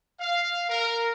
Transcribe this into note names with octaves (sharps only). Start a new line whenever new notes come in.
F5
A#4